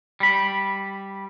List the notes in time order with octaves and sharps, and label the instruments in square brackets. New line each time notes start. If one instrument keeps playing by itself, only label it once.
[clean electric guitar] G3 B5